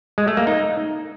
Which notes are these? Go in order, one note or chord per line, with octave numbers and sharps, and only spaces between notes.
G#3
A3
A#3
D#4